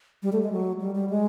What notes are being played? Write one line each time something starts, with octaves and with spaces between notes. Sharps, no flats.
G3
A3
G#3
F#3
G3
G3
G#3